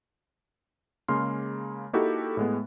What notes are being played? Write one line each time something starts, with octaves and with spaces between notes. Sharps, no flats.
C#3 G#3 A#3 C6 F6
A#3 D#4 E4 F#4 G4 A4
A2 G#3 B3